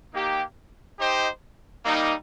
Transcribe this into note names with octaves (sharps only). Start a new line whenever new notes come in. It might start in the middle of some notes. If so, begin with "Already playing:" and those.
A#3 D#4 G4
D#4 G4 C5 D#5 G5
G3 A#3 D#4